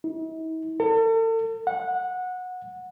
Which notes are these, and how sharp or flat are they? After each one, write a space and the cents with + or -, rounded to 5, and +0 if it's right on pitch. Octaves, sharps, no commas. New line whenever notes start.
E4 -45
A4 +40
F#5 -20